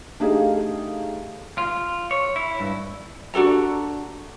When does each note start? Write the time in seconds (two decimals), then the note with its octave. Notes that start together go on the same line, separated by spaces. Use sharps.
0.20 A3 D4 D#4 G4 G#4 F5
1.58 F4
2.11 C#5
2.36 E4
2.60 G2
3.34 D4 F#4 A4 A#5